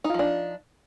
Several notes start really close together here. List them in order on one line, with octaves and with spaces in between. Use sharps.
D#4 F4 F3 D4